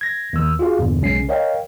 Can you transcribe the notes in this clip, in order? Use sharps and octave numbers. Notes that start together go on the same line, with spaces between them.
G#6 A#6
D#2 D#3 E6
F4 F#4 G#4 F5
E2 G2 A#2 D3
B1 C#3 G#3 C#4 C7
A#4 C#5 D#5 F5 G5